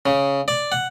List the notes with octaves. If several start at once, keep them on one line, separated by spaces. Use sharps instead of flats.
C#3
D5
F#5